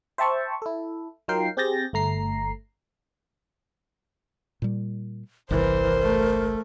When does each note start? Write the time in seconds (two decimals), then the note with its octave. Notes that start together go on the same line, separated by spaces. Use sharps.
0.18 C5 E5 G5 A5 C#6
0.62 E4 A4
1.28 F#3 D#4 F4 A#4 G5 C7
1.57 C4 G4 G#4 G6 A6 A#6
1.93 G1 A3 A#5 C7
4.62 A#2 G3
5.51 G1 C2 E3 A#4 C5
6.01 A3